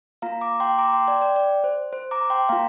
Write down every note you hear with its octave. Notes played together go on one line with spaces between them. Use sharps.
A#3 F4 F5 A#5
A#5 D6
G5 C6
A#5 D6
G5 C6
D5 G5
D5 G5
D5
C5
C5
A#5 D6
G5 C6
A#3 F4 F5 A#5